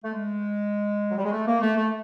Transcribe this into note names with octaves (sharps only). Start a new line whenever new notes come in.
A3
G#3
F#3
G3
G#3
A3
A#3
A3
A3